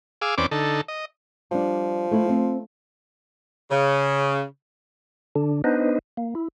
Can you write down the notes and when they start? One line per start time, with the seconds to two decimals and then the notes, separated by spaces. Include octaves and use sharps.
0.22 G#4 F5 D6 E6
0.38 E2 C4 C#4 B4 D5 D6
0.51 D3 D#4 A4
0.88 D#5
1.51 F3 G3 D4
2.11 A3 E4
2.29 C4
3.71 C#3
5.36 D3 D4
5.64 B3 D4 D#4 B4 C5 D#5
6.17 A#3
6.35 E4